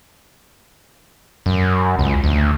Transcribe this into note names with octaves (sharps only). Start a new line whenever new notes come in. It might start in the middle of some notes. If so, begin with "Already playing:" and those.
F#2
C#2
D2